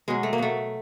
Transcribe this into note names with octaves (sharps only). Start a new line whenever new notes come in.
B2 F#3 G#3
A3
A#3
B2 F#3 A3